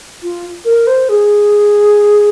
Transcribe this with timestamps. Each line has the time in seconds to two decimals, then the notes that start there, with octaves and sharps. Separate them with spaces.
0.23 F4
0.65 A#4
0.87 C5
1.09 G#4